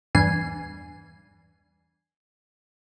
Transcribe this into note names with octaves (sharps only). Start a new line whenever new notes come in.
E2 G2 G#5 C7